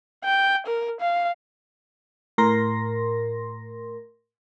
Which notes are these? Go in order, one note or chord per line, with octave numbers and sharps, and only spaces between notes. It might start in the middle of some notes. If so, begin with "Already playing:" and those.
G5
A#4
F5
A2 A#4 C6 A#6